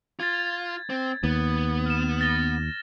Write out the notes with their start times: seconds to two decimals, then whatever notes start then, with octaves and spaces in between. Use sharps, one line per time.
0.20 F4 G#6 A6
0.90 C4
1.24 D#2 B3
1.86 F6 E7
2.21 A6 A#6 G7